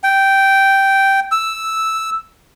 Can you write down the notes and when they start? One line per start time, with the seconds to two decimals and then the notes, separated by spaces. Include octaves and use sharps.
0.04 G5
1.32 E6